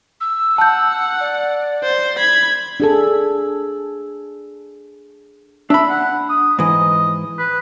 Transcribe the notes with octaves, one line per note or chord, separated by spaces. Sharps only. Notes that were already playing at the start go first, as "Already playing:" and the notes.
E6
F#5 A5 G6
D5
C5
B5 G#6
D4 G#4 A4
D4 E5 B5
F#5
D#6
G#2 E3 D#5
B4